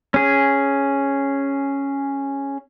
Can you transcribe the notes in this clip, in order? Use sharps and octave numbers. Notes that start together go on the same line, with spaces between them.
C#4 G#4